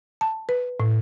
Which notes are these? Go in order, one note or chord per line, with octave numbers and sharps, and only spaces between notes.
A5
B4
A2